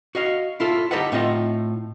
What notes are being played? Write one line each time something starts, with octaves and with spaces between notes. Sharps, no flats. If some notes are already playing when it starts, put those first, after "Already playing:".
F#4 D#5 F5
E4 F4 A4
D#4 G4 A4 B4 D#5 F#5
A2 C4 D#4 F4 D#5 F#5